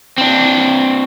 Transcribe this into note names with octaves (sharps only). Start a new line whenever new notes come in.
C4 D4